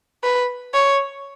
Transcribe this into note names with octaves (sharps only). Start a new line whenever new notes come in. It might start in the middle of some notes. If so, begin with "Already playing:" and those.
B4
C#5